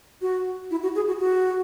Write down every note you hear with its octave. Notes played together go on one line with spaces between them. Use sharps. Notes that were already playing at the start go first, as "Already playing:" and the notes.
F#4
E4
F#4
G#4
F#4
F#4